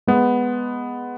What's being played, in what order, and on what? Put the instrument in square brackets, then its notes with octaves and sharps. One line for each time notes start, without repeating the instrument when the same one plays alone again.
[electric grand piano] G#3 B3